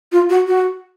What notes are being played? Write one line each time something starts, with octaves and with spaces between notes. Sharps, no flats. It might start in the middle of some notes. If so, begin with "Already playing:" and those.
F4
F#4
F#4